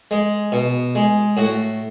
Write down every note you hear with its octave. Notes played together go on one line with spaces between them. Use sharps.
G#3
B2
G#3
A2 F#4